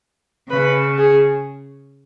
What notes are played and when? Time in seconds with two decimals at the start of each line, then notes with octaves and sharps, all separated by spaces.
0.50 C#3 B4
0.98 G#4